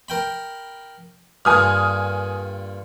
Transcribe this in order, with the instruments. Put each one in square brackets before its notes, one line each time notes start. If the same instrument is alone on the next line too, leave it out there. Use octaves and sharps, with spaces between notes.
[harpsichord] A#4 G5 B5
[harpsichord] G2 A#2 D3 [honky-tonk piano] G#5 D#6 F6